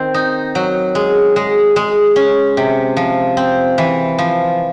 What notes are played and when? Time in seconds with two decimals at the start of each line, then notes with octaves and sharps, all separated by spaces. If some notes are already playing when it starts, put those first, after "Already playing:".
Already playing: D#3 C4
0.14 D#4
0.55 F#3
0.95 G#3
1.36 G#3
1.76 G#3
2.16 C#4
2.57 C3
2.97 F3
3.37 C4
3.78 E3
4.18 F3